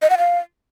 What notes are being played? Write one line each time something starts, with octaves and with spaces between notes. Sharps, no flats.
D#5
F#5
F5